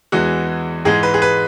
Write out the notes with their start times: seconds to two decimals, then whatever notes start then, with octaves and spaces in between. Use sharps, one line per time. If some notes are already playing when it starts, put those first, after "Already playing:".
0.12 E2 E3 G#3 F#4
0.85 G#2 E3 G#3 G#4
1.03 B4
1.14 G#4
1.22 B4